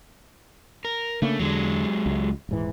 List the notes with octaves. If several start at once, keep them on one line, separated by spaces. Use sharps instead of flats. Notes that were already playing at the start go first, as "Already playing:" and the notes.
A#4
C#3 A3 A#3 D4
E2 D3 F#3 G#3
C#2
D#1 G#2 E3